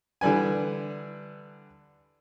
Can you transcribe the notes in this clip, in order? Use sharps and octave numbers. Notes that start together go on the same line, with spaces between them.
D3 E3 G3 B4 G#5